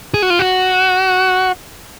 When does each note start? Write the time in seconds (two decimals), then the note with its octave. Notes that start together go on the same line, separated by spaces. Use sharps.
0.14 G#4
0.22 F#4
0.30 F4
0.39 F#4